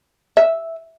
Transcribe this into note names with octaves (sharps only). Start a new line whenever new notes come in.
E5